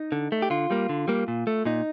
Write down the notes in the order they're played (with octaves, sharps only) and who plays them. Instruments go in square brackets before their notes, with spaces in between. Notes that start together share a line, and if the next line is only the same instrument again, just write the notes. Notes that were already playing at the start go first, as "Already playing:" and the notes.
Already playing: [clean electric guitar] D#4
D3
A3
G4
D3 F4
G3 A#3
D3
G3 A#3
A#2
A3
A#2 D#4